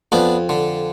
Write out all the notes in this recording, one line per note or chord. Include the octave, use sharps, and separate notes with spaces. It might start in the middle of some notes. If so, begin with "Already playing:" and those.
F2 B3 D4
D3